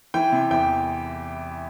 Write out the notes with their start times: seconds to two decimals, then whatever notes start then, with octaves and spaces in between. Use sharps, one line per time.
0.14 E3 G5
0.32 C3
0.51 E2 G5